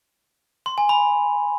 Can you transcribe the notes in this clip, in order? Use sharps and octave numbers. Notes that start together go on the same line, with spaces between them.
C6
G#5
B5